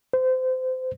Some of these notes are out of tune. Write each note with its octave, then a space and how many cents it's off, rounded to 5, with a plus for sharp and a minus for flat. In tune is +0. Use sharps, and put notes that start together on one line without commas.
C5 -25